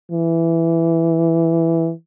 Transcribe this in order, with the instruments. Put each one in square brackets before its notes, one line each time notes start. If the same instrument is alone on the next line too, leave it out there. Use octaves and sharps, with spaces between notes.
[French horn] E3